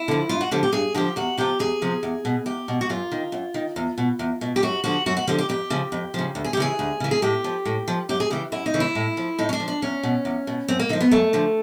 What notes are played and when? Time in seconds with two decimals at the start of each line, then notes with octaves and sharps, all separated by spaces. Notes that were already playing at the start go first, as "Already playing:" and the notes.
Already playing: E4
0.08 D3 F3
0.29 G2 F4
0.41 F#4
0.51 D3 F3 G4
0.63 G4
0.73 G2 G#4
0.94 D3 F3 G4
1.16 E2 F#4
1.38 C3 F3 G4
1.59 E2 G#4
1.82 C3 F3
2.03 E2
2.25 B2
2.46 E2 G4
2.68 B2
2.81 F#4
2.89 F#2 F4
3.12 D#3
3.32 F#2
3.54 D#3
3.76 E2
3.98 B2
4.19 E2
4.41 B2
4.56 G4
4.63 F#2 F#4
4.84 D3 F3 F#4
5.06 F#2 F#4
5.17 F#4
5.27 D3 F3 G4
5.39 G4
5.49 F2 G4
5.70 C#3 F3
5.92 F2
6.14 C#3 F3
6.35 D2
6.44 G#4
6.53 G4
6.57 C#3 E3 G#4
6.79 D2
7.00 C#3 E3
7.11 G#4
7.22 A2 G4
7.44 F3
7.65 A2
7.88 F3
8.09 F#2 G4
8.20 G#4
8.30 C#3 E3 G4
8.52 F#2 E4
8.66 D#4
8.74 C#3 E3
8.80 E4
8.95 A2
9.17 F3
9.38 A2 D#4
9.49 C#4
9.53 D4
9.60 F3
9.68 D4
9.82 E2 C#4
10.03 B2
10.25 E2
10.47 B2
10.68 F#2 C4
10.79 A#3
10.89 D3 F3 D#4
11.01 B3
11.11 F#2 A3
11.33 D3 F3